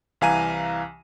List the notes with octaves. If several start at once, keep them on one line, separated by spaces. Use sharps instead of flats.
C2 E3 F5 G#5 A#5 D#7